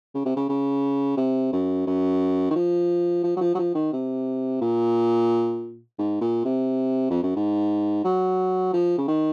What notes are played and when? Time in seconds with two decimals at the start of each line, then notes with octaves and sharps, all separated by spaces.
0.15 C#3
0.25 C3
0.36 C#3
0.49 C#3
1.17 C3
1.52 F#2
1.87 F#2
2.50 D#3
2.55 F3
3.23 F3
3.36 F#3
3.41 F3
3.55 F#3
3.59 F3
3.75 D#3
3.93 C3
4.61 A#2
5.99 G#2
6.21 A#2
6.45 C3
7.10 F2
7.23 F#2
7.36 G#2
8.04 F#3
8.73 F3
8.98 C#3
9.07 D#3